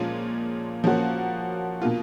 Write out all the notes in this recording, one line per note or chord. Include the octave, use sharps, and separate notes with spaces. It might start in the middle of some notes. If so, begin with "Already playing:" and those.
Already playing: A#2 F3 G#3 C#4 F4
F3 A#3 C#4 F#4
B2 A#3 F4